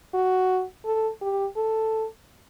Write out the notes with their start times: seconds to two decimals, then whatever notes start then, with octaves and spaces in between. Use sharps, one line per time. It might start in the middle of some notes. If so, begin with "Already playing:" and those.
0.14 F#4
0.85 A4
1.22 G4
1.57 A4